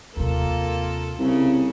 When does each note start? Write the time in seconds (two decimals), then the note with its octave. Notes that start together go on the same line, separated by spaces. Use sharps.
0.17 D#2 C3 A#3 F4 A4 A#4
1.19 C2 C#3